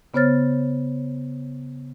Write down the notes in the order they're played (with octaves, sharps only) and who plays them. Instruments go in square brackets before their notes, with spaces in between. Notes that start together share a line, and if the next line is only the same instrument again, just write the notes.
[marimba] C#3 B3 C5 C#5 F6 A6